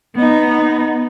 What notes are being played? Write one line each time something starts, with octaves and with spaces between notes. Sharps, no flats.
B3 D#4